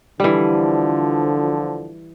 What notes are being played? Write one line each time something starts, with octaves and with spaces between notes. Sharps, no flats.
D3 E3 F3 G3